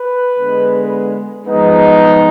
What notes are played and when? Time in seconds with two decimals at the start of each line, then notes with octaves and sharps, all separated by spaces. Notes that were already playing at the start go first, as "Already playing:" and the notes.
Already playing: B4
0.37 D3 G#3 B3
1.45 G#2 F3 G#3 B3 D#4